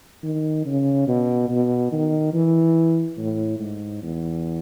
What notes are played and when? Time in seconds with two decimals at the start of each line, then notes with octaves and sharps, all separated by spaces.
0.24 D#3
0.66 C#3
1.08 B2
1.50 B2
1.92 D#3
2.33 E3
3.18 A2
3.60 G#2
4.02 E2